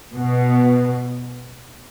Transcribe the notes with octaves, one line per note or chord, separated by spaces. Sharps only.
B2